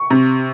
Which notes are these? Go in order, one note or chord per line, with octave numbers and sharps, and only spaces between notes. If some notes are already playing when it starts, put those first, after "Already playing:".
Already playing: C#6
C3